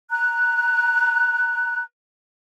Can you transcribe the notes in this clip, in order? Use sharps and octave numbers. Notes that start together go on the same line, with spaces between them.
A#5 F#6